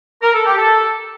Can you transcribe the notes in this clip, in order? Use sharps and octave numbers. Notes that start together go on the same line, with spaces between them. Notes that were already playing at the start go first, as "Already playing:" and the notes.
A#4
A4
G4
A4